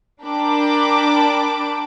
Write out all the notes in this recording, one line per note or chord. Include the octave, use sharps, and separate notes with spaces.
D4 A#4 G5 A5 B5 D6